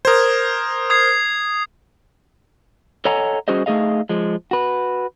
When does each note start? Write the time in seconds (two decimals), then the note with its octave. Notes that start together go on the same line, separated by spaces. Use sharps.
0.05 A#4 C5 D#6 G#6
0.90 D#6 G#6 C7
3.05 A4 C#5 D#5 F#5 G#5 A#5
3.48 G3 C#4 F#4 G#4 C5 D#5
3.66 A3 D#4 G#4 D#5 F5
4.09 F3 G#3
4.51 F#4 B4